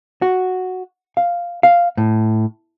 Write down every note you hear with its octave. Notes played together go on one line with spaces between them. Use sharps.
F#4
F5
F5
A2